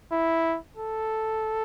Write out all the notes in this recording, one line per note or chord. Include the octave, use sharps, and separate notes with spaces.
E4
A4